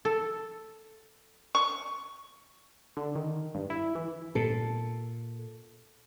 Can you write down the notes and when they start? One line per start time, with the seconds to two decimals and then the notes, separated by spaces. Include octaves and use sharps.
0.05 A4
1.55 C#6
2.97 D3
3.16 D#3
3.55 G2
3.70 E4
3.95 E3
4.35 A#2 A4